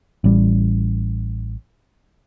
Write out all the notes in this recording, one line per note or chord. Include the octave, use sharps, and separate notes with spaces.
A1 G3